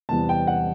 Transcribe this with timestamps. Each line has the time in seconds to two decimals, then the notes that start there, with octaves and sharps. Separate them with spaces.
0.09 E2 C3 E3 G3 B3 A5
0.29 G5
0.47 F#5